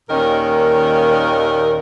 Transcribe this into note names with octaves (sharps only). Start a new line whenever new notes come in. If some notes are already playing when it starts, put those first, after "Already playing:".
D#2 A#2 D#3 C#4 A#4